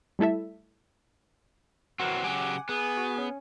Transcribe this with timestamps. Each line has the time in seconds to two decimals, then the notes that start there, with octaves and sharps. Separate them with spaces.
0.19 G3 A3 E4 A4 E5
1.99 E3 F#3 C4 F#4 A#4 F#5
2.24 C#3 F#3 G4 F#5 G#5 D6
2.69 B3 G#4
2.98 F#4
3.18 C#4